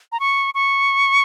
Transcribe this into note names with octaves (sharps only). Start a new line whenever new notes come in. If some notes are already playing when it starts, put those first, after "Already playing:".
A#5
C#6
C#6